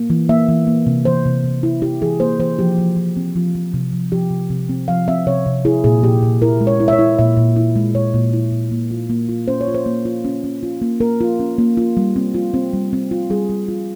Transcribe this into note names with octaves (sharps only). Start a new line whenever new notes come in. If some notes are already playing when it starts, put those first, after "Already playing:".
Already playing: A#3
E3
A#3 E5
E3
A#3
C3
E3 C5
C3
C3
E4
E4 G4
E3 G#4
A#3 C5
E3 C5
F3 G4
F3
F3
C4
F3 F4
F3
C3
F3
F3 G4
C3
C3
C4
F3 F5
C4 E5
C3 C#5
C3
E4 G#4
A#2 G#4
A#2 G4
A#2
E4 A#4
G#3
C#5
E4
E5
C#5
E4
A#2 E5
A#2
E4
G#3
A#2 C#5
A#2
E4
A#2
A#3
F4
A#3
F4
C#4 C5
C#5
F4
C5
A#3
F4
C#4
C#4
F4
A#3
A#3 A#4
F4
C#4
A#3
F4
G3
C4
F4
C4
G3
C4
F4
G3 G#4
G3
F4